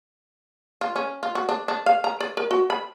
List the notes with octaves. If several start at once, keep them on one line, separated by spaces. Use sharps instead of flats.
F4
C#4
F4
F#4
D4
D4
F5
A#5
D5
A#4
F#4
B5